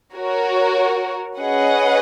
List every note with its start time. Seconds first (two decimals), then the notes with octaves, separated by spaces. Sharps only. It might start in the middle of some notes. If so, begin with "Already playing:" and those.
0.14 F#4 A#4 C#5
1.39 C#4 G#4 B4 D#5 F#5